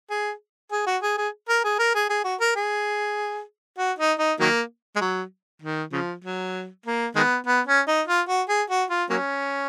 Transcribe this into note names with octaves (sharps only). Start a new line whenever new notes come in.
G#4
G#4
F#4
G#4
G#4
A#4
G#4
A#4
G#4
G#4
F#4
A#4
G#4
F#4
D#4
D#4
D#3 F#3 A#3
G#3
F#3
D#3
C#3 F3
F#3
A#3
D#3 G#3 B3
B3
C#4
D#4
F4
F#4
G#4
F#4
F4
F#3 A#3 C#4